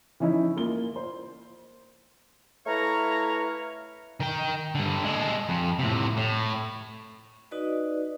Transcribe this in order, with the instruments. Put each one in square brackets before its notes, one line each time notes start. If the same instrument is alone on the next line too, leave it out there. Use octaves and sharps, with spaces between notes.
[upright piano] E3 F3 C#4 D#4 E4
A#3 F4 G7
C5
[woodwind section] A3 E4 B4 C#5 F5 A#5
[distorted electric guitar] D#3 G5
G2 D3
G#3 A4
F2
A2 C3
A2
[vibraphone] D#4 F#4 B4 D5 D#5